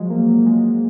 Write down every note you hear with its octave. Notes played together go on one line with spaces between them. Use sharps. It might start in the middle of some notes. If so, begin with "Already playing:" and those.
Already playing: F3 F#3 G#3
A#3
G#3